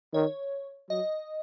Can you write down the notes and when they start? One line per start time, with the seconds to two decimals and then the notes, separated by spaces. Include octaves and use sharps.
0.14 D#3 C#5
0.89 F#3 D#5